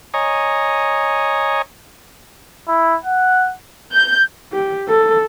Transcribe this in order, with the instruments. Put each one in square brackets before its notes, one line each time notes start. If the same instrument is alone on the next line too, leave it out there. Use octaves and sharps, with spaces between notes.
[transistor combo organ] C#5 D#5 G#5 A#5
[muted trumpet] E4
F#5
[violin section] G6
[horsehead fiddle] G4
A4